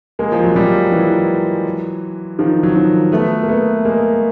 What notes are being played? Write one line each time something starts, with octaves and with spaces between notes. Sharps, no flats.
G#3 A#3
F3
F#3
F3 G3
E3 F#3
D#3 F3
F#3
D#3 F3
A3 B3
A#3
A3 B3
G#3 A#3